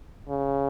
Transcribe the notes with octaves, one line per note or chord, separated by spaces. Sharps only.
C#3